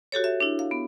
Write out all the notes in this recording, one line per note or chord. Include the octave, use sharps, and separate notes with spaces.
F#4 G4 A4 C#5
E5
D4 E4
F5
B3